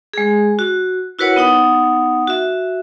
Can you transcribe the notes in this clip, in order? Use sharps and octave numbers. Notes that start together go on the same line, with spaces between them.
G#3 G#4
F#4
E4 F#4 A#4 B4 C#5 F#5
B3 D#4 F#5 D#6
F#4 E5